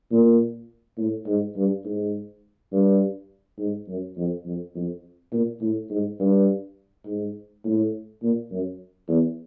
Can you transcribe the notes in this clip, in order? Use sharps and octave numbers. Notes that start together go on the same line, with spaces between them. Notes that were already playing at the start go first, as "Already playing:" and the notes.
A#2
A2
G#2
G2
G#2
G2
G#2
F#2
F2
F2
F2
A#2
A2
G#2
G2
G#2
A2
A#2
F#2
E2